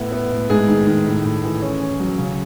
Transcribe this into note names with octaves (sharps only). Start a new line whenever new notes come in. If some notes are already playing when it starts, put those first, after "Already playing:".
Already playing: A2 B3 E4
B3
A2
G#2 G#4
D#3
D#3
A2
A2
E3
C#4
C#4
F#3
C#3